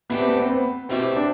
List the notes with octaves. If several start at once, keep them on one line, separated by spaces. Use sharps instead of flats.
E3 A3 B3 D4 G4
C4
B3
C4
B3
E2 B2 A3 C4 E4 G4
C4
D4